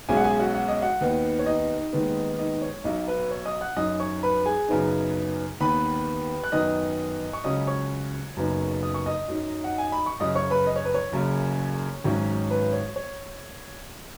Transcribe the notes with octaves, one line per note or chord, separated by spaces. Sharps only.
B1 B2 G#3 C#4 G#4 G#5
F#5
G#4 G#5
F#4 F#5
F#5
D#5
F#4 F#5
D#2 D#3 B3 D#4
C#5
D#4 D#5
D#2 D#3 G#3 B3
D#4 D#5
C#5
B1 B2 F#3 D#4 D#5
B4
C#5
D#5 D#6
F#5 F#6
F#2 F#3 D#4 D#5 D#6
C#5 C#6
B4 B5
G#4 G#5
F#2 C#3 B3 D#4
D#2 D#3 B3 B4 B5
F#6
F#2 D#3 B3 D#5 D#6
C#6
C#2 C#3 F#3 C#4 D#5 D#6
C#5 C#6
F#1 F#2 C#3 B3 D#4
D#6
C#6
D#5 D#6
F#2 F#3 D#4
F#5
G#5
B5
C#6
F#2 C#3 F#3 D#5 D#6
C#5 C#6
B4 B5
D#5
C#5
B4
C#5
F#1 F#2 C#3
G#1 G#2 F#3 C#4
B4
C#5
C#5